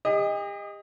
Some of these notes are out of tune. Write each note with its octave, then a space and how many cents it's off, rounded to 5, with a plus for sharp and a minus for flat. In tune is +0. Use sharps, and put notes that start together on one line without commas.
G4 +45 D#5 +0